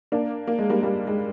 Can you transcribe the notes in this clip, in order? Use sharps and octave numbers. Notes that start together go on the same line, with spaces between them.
A#3 D4
A#3
G#3
G3 A#3
G3 A#3
G#3